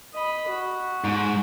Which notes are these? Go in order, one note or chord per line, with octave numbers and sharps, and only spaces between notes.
D#5 B5
F#4
G#2